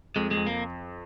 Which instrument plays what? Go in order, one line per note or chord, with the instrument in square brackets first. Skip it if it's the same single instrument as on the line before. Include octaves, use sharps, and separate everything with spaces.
[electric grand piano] F2 [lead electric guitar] G#3
[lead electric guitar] G#3
[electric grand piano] F2
[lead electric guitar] A#3